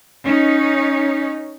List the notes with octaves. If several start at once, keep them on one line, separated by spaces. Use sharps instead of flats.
C#4 D#4